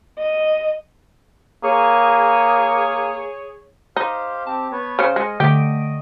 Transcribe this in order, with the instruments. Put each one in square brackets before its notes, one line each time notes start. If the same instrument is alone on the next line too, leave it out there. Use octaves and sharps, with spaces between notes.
[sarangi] D#5
[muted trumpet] A#3 [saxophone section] G#4 C#5
[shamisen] D#4 [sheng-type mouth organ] G4 C5 F5
[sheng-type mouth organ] C4 G4 [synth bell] A5
[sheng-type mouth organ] B3 B4 C#5
[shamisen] C#3 C5 [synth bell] F6 C#7
[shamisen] G#3 [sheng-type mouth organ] D#5
[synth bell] D3 A3 D7 [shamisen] G4